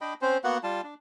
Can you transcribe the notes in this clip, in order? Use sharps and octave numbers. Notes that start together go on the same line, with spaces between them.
D4 D#5 G5 B5
C4 C#4 C5
A#3 B3 F#4 F#5
G3 F4 A5
D4